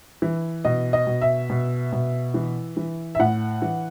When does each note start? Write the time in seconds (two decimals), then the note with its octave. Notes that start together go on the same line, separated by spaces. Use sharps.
0.22 E3
0.65 B2 D#5
0.93 D#5
1.07 B2
1.22 E5
1.50 B2
1.93 B2
2.34 E3
2.77 E3
3.15 E5
3.19 A2 F#5
3.62 E3